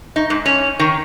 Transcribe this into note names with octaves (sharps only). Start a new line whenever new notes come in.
D#4
G#2
C#4
D#3